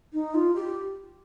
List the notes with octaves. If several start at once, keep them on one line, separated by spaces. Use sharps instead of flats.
D#4
F4
G4